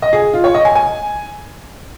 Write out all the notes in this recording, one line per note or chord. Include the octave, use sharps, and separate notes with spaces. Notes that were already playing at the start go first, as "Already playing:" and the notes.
D#5
G#4
F4
C#5
D#5
G#5
G#5